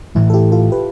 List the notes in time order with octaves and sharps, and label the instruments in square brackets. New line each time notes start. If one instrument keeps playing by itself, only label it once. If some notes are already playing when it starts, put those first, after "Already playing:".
[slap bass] A2 E3 A3 [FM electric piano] E4
[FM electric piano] A4
E4 G4
F4 A4
G4 B4